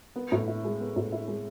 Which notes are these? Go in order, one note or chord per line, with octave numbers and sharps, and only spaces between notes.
B3
A2
E4
G#3
B3
A2
E4
G#3